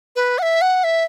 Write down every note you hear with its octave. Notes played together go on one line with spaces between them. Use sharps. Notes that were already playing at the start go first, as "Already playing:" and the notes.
B4
F#5
E5
F#5
E5